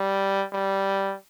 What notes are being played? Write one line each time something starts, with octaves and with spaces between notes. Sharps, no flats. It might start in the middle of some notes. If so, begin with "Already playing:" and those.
Already playing: G3
G3